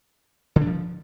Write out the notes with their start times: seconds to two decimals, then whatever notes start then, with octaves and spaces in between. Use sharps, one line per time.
0.56 D3
0.61 D4
0.67 F3